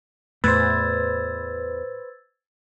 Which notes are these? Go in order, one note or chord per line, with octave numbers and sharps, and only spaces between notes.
E2 A2 A3 B4 C5 E6 G#6 A6